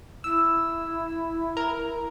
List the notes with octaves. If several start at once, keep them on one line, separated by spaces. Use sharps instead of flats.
E4 E6
A#4